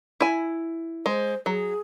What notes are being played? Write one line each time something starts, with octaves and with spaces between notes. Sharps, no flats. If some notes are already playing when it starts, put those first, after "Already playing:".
E4 G#5
G#3 C5
F#3 G#4